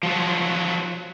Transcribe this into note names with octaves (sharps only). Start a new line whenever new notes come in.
F3 F#3